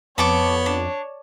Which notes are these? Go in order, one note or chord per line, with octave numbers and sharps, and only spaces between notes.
F2 B3 C#5 A5 C#6 D6
D4